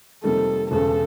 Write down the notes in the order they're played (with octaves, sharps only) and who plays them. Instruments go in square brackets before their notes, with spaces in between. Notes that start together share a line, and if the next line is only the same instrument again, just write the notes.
[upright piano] F2 C3 D#3 G3 A#3 [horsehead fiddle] A4
[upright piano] E1 E2 C#3 [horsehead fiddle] A4